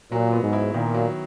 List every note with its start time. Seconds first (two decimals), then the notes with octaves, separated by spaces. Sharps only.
0.12 A#2 F#3
0.32 B3
0.43 G#2
0.53 E4
0.74 A#2 D#3
0.94 F#3